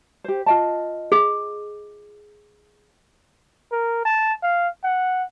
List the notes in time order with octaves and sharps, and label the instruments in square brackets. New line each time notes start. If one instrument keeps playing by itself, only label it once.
[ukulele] G4 C5
F4 D#5 A5
[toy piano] G#4
[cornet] A#4
A5
F5
F#5